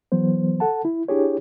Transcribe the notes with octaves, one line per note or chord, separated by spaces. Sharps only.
E3 F#3 B3 C5
A4 F#5 A5
E4
D4 E4 G4 G#4 C#5